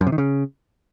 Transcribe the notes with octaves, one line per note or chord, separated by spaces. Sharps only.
F#2
C3
D#3
C#3